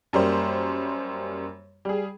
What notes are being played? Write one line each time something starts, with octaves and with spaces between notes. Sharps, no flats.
F#2 G3 A#3 C5
G3 G#4